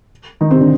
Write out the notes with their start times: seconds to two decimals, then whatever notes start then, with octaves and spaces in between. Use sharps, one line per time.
0.41 D#3 D#4
0.51 C3 C4
0.61 D3 D4